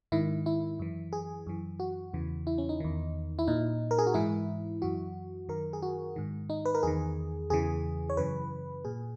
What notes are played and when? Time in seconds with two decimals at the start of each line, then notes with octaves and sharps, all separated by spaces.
0.12 G#2 D#3 E4
0.46 E4
0.79 F#2 E3
1.13 G#4
1.47 F#2 E3
1.80 F#4
2.14 E2 C#3 E3
2.47 E4
2.58 C#4
2.69 D#4
2.80 E2 D#3
3.39 E4
3.47 A#2 D#4
3.91 A#4
3.99 G#4
4.07 F#4
4.14 G#2 E3 E4
4.82 F#2 E3 F#4
5.49 F#2 D#3 A#4
5.73 G#4
5.82 F#4
6.16 G#2 D#3
6.50 D#4
6.65 B4
6.75 A#4
6.83 E2 D#3 G#4
7.50 E2 C#3 E3 G#4
8.10 C#5
8.17 F#2 C#3 E3 B4
8.85 A#2 G#4